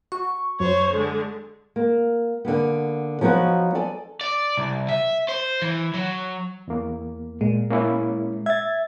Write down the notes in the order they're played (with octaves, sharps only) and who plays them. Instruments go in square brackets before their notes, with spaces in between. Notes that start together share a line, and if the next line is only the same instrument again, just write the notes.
[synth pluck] F#4 [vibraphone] C#6
[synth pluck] F#2 F#3 [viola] C5 C#5
[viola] D3 G#3
[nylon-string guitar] A#3
D3 A#3 B3
F3 F#3 B3 D#4 F#4 B4
A4 D5 G#5
[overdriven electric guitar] D5
C2
E5
C5
E3
F#3
[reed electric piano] E2 A#3
[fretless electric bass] A#2 [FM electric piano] G#3
[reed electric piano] A#3 C#4 E4
[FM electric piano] E5 [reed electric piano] G#6 A6